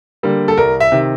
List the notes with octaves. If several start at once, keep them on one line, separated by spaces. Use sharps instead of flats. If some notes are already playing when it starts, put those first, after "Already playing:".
D3 G3 A#3
A4
C2 A#4
E5
C3 D#3